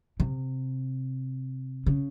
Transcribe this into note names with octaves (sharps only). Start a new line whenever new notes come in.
C3
C#3